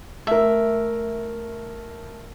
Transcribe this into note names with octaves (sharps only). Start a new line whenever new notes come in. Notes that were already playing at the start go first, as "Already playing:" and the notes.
A3 A#4 E5